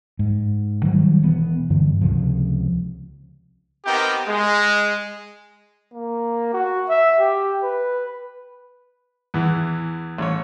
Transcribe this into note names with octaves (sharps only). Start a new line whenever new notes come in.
G#2
D#3 F#3 G3
E1 E2 B3
G2 D3 E3
C#2 C3 F3
B3 C4 D#4 G4 A#4 G5
G#3
A#3
F#4
E5
G4
B4
E2 E3
A1 C#5